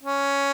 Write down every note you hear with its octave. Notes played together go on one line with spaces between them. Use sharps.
C#4